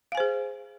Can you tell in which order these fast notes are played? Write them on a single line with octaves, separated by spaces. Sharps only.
F5 G#5 C5 G#4